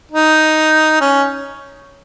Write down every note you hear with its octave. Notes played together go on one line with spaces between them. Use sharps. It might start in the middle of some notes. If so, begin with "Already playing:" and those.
D#4
C#4